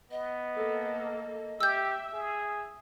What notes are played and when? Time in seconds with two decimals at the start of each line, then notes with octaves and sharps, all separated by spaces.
0.11 B3 D#5
0.55 A#3 A4
1.61 G4 E5 E6 G6
2.14 G#4